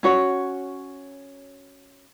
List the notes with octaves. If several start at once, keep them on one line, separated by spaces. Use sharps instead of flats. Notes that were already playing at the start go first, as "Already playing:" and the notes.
C#4 F#4 C#5